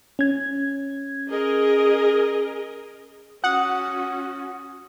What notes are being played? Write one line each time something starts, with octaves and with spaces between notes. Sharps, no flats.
C#4 G#6
G#4 A#4 D#5
C#4 F#4 F#5 D#6